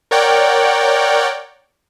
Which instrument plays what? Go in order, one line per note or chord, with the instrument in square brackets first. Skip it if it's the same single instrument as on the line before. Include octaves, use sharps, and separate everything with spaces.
[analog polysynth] A#4 C#5 D5 F#5 G5